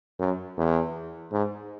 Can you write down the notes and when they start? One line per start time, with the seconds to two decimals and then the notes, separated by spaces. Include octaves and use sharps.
0.19 F#2
0.57 E2
1.32 G#2